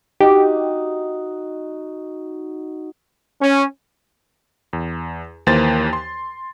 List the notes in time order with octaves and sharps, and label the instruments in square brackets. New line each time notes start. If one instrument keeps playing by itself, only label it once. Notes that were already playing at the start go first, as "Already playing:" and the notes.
[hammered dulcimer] D#4 F#4 [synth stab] G4
[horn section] C#4
[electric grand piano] E2
D#2 E3 A#3 C5 A6
C6